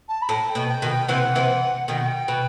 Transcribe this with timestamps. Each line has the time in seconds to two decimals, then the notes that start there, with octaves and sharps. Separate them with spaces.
0.09 A5
0.22 B5
0.29 A2 A5
0.49 G5
0.55 B2
0.69 G5
0.82 B2 D#3
0.89 G5
1.08 C3 E3 F#5
1.35 C3 E3
1.88 B2 D#3 G5
1.98 F#5
2.07 G5
2.28 B2